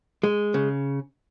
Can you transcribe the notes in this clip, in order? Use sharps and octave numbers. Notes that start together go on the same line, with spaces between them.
G#3
C#3